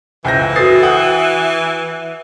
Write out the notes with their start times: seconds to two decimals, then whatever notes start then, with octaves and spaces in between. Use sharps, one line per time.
0.25 C#2 E3 C5 G5 G#5 G6 A#6
0.56 F#4 A4 B4 D#6 A6 C7
0.83 F#5 G5 D#6